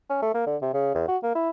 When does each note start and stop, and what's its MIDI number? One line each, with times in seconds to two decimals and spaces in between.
0.10 0.22 61
0.22 0.33 57
0.34 0.45 58
0.47 0.57 50
0.62 0.72 48
0.74 0.91 49
0.95 1.05 40
1.08 1.17 66
1.23 1.33 58
1.35 1.50 64